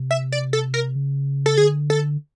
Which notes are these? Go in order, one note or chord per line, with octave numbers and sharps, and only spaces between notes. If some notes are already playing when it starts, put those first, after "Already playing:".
Already playing: C3
E5
D5
A4
A#4
C#3
A4
D3 G#4
A4